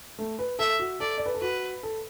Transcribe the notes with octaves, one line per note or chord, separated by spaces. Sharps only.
A3
B4
A4 E5
F#4
A4 D5
D5
B4
A4
F#4 B4
A4